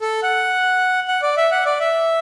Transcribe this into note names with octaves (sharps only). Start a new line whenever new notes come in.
A4
F#5
F#5
D5
E5
F#5
D5
E5